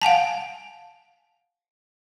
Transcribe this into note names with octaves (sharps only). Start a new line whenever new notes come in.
F5 F#5 G#5 A5